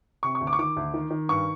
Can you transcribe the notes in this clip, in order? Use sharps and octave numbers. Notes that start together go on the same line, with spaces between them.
C3 C#6
C#6
D2
D6
C#6
D#3 D6
D2
D#3
D#3
G2 C#6